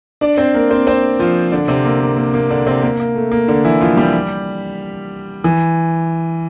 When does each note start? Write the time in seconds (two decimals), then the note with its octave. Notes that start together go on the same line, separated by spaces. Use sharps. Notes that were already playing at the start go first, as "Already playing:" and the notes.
0.21 D4 D5
0.37 C4 C5
0.54 A#3 A#4
0.70 C4 C5
0.87 C4 C5
1.19 F3 F4
1.52 D3 D4
1.68 C3 C4
1.85 A#3
2.01 A#3
2.17 A#3
2.34 A#3
2.50 D3 D4
2.67 C3 C4
2.83 A#3
3.00 A#3
3.16 A3
3.32 A#3
3.48 D3 D4
3.65 E3 E4
3.81 F3 F4
3.97 G3 G4
5.44 E3